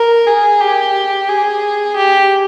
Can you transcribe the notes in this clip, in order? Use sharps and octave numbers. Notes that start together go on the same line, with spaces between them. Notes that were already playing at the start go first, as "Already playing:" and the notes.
Already playing: A#4
G#4
G4
G#4
G4